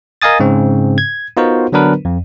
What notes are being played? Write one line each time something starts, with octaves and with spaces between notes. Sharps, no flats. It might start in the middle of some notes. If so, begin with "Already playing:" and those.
A#4 D#5 F5 G#5 D#6 A6
G#2 C#3 C4
G#6
B3 D#4 F4 F#4 A#4 C5
D3 F#3 B3 D4 A#4 B4
F2